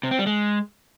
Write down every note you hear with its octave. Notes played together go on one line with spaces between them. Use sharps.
C3
C4
G3
G#3